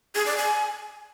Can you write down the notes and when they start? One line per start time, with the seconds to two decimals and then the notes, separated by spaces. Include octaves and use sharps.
0.15 G#4
0.26 D5
0.37 G#5